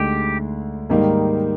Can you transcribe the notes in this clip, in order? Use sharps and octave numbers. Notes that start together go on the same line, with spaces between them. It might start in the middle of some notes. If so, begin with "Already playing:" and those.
Already playing: D2 D3 G#3 D#4 G4
G#2 D#3 G3 A#3 D#4